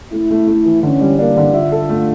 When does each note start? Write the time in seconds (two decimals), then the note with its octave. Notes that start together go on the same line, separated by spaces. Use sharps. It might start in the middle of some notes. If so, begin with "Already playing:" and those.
0.12 A3 E4
0.30 A3
0.47 A3
0.66 E3
0.83 D3 C#4
1.01 G3
1.19 A#3 D4
1.37 D3
1.54 F4 E5
1.72 A4
1.89 A3